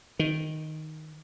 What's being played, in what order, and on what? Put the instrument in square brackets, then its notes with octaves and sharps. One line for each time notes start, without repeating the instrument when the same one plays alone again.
[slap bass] D#3